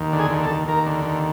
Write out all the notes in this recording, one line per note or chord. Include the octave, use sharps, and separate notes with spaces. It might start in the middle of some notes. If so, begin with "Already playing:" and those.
Already playing: D#2
D3
G#4
D#2
A4
D#2
D#2 A#4
D3
D#2